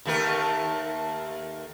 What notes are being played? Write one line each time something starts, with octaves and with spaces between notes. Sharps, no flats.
D#2 A3 A#4